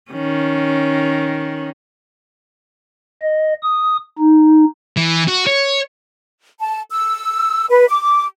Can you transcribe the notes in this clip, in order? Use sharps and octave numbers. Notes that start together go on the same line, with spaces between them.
D#3 C#4
D#5
D#6
D#4
E3
F#4
C#5
A5
E6
B4
D6